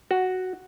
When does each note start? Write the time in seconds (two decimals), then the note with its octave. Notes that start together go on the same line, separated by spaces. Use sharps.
0.11 F#4